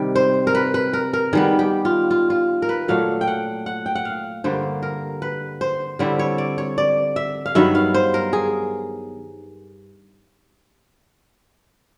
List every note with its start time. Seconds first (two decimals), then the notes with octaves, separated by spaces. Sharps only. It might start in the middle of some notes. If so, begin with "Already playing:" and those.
Already playing: C3 D#3 G3
0.15 C5
0.47 A#4
0.55 B4
0.74 B4
0.93 A#4
1.13 A#4
1.33 D#3 G3 B3 G#4
1.59 G4
1.85 F4
2.11 F4
2.30 F4
2.62 A#4
2.69 B4
2.88 A#2 F#3 A3 F5
3.21 G5
3.27 F#5
3.66 F#5
3.86 G5
3.95 F#5
4.05 F5
4.44 G2 D3 G3 A#3 C5
4.83 A#4
5.22 B4
5.61 C5
5.99 D3 G3 C4 E4 C#5
6.19 C#5
6.38 D5
6.58 C#5
6.78 D5
7.16 E5
7.46 F5
7.55 G2 D#3 F#3 B3 E5
7.75 F5
7.94 C5
8.14 A#4
8.33 G#4